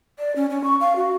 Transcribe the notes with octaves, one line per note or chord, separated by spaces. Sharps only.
D5
C#4
C#4
C#6
F5
F#4